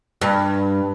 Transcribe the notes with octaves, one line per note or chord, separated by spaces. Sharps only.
G2